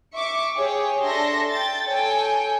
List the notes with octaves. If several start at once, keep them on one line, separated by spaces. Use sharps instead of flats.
E5 C#6 D6
G4 G#4 C#5
D4 A4 E5 A5 C6 A#6
G5 G6 A6
A4 C#5 G5 G#5